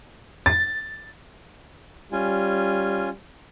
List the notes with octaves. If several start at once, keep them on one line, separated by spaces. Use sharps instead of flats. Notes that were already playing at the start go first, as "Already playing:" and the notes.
A6
G3 C#4 F4 G#5